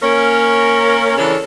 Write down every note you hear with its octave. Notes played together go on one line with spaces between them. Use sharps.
A#3 C#4 A#4
C#3 E3 D4 A4 A#4 C#5